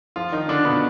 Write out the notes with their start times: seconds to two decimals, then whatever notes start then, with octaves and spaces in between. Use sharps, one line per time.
0.16 F3 F4
0.32 D#3 D#4
0.49 D3 D4
0.65 B2 B3